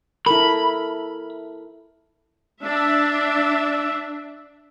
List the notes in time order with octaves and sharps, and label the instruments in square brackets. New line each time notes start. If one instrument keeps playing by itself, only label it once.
[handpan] E4 A4 A#4 [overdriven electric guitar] B5
[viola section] D4 E5